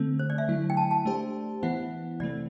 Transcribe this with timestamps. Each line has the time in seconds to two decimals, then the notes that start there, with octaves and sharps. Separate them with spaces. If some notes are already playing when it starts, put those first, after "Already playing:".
Already playing: D3 A3 C4
0.19 C5
0.30 D5
0.38 E5
0.48 D3 F#3 A3 E4
0.70 G5
0.77 A5
0.91 A5
1.05 A3 D4 G4 C5
1.63 E3 B3 E4 F#5
2.20 C3 E3 A3 C4 D5